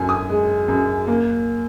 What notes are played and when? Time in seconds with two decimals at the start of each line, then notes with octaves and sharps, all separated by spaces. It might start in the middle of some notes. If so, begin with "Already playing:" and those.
Already playing: F#2 D3 G#5
0.09 D#6
0.29 G#3
0.68 F#2
1.07 A#3